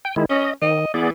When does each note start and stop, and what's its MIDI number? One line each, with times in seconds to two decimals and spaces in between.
0.05 0.15 79
0.16 0.25 51
0.16 0.25 56
0.16 0.25 64
0.30 0.50 61
0.30 0.53 75
0.62 0.85 51
0.62 0.89 75
0.94 1.10 52
0.94 1.10 59
0.94 1.10 68
0.94 1.10 74